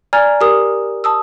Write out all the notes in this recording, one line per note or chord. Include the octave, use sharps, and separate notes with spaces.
D5 G#5 A#5 F6 G#6
G4 A#4 D#6
A5 D#6 E6